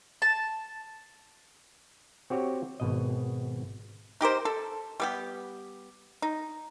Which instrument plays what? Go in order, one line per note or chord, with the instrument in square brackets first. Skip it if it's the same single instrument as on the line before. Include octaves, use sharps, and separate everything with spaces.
[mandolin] A5
[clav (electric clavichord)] C4 F#4 G4 C#5
G#1 B2 D#5
[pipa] D#4 G4 A#4 C5
A4
G3 B3 G4
D#4